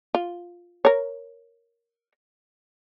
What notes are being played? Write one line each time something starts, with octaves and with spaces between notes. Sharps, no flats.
F4
A#4 C#5